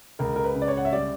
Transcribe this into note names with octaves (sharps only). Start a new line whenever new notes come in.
C#2 A#4
A#4
B4
C#3
D5
C#5
F#5
E5
G3 D5